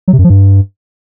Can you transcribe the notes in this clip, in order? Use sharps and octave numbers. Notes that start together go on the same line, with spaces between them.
F#3
C3
F#2
F3
G2